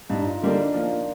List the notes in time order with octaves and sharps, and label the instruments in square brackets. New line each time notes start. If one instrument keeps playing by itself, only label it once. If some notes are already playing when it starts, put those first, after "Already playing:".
[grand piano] G2 [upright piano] D#4
[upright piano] D#4
F4
[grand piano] D3 G3 A#3 D4 [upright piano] D#4
[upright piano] D4
[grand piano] F3 [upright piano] A#3
[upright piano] A#3